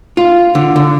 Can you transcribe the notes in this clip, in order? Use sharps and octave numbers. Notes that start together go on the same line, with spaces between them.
F4
D3
D3